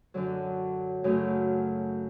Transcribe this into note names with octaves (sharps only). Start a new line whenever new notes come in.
F#2 D3 F#3
F#2 C#3 F#3 A3